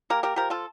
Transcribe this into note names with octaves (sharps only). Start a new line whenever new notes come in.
A#3 G4 A#4
G4 A#4
F3 G4 A#4
F4 A4